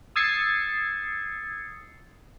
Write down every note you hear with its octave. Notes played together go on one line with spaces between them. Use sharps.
D#6 E6 G#6 A6 C7 C#7